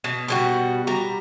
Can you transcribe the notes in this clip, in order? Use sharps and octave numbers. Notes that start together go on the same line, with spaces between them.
B2
B2 G3 F#4
G3 A#5